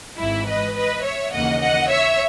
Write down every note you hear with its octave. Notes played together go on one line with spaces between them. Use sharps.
G#1 G#2 E3 E4
B4 D#5
B4 D#5
C#5 E5
D#2 C#3 E3 A#3 D#5 F#5
D#5 F#5
C#5 E5